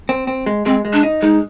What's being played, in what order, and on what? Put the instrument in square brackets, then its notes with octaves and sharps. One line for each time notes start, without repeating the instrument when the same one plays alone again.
[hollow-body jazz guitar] C4
C4
G#3
[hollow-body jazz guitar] G#3 [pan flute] C4
[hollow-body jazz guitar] G#3
[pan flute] D4
[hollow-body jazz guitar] D#4
[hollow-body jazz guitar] G#3 [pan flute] D#4